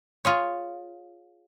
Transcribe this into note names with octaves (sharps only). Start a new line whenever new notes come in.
F4 G#4 C#5